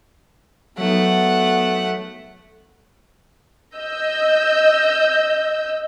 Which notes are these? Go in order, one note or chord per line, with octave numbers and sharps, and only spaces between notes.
F#3 A3 B3 D#4 F#5
D#5 E6 G6